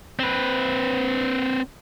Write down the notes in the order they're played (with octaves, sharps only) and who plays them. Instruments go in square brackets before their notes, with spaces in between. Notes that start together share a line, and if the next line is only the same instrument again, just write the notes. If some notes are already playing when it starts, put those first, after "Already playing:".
[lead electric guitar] C4 B4